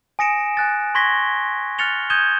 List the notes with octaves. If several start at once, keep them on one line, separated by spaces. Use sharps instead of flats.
G#5 D#6 A#6 C#7 D7 E7
G#5 F#6 A6
C6 C#6 G#6 A#6 B6 G7
F6 F#6 A6 C#7 F7 G7
D#6 G6 G#6 D#7 E7 G7